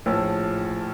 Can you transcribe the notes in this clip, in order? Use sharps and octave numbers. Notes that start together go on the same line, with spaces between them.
A#1 A2 F3